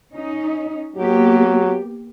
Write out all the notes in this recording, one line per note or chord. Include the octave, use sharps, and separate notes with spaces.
C#4 D#4
F#3 A#3 B3 G4